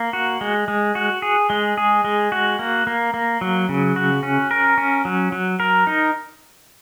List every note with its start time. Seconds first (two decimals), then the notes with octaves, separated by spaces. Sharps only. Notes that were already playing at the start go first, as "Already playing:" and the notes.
Already playing: A#3
0.13 F#4
0.41 G#3
0.68 G#3
0.95 F#4
1.22 G#4
1.50 G#3
1.77 G#4
2.05 G#3
2.32 F#4
2.59 A#3
2.87 A#3
3.14 A#3
3.41 F#3
3.69 C#3
3.96 F#4
4.23 C#4
4.51 A#4
4.78 C#4
5.05 F#3
5.32 F#3
5.60 A#4
5.87 D#4